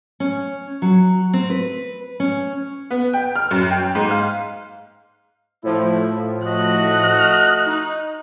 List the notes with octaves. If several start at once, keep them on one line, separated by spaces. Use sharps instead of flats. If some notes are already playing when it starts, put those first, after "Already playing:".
C#4
F#3
C4
B4
C#4
B3
G5
F6
F#2
G5
G#2
F5
A2 F3 E4
A3 F#4 D#5 F#6
D#4